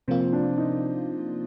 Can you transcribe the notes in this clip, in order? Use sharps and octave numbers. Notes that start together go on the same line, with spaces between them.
C3 F3 A#3 C4 F4
D4
D#4